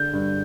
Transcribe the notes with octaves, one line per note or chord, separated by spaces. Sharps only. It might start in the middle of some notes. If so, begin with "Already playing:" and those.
Already playing: D3 G6
G2